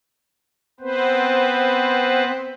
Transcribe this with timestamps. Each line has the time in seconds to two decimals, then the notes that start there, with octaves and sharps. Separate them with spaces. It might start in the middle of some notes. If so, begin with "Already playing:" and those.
0.80 B3 C4 B4 C5